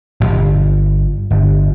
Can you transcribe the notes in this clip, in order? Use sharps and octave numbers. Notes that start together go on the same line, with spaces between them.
D1 G1
G1